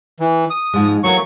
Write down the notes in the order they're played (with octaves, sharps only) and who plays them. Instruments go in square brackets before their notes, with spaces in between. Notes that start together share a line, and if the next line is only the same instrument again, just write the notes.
[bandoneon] E3
D#6
[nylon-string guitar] G#2 F3 G#3
[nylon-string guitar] E3 A3 A#3 [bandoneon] F#3 C#6